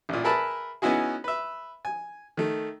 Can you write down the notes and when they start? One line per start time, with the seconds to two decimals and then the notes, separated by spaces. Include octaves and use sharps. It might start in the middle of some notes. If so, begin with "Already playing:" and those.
0.09 A1 A#2
0.24 G#4 A#4 B4 E5 A5 B5
0.82 B3 C#4 D#4 E4 F#4 G#4
1.24 B4 E5
1.85 G#5
2.37 D#3 A3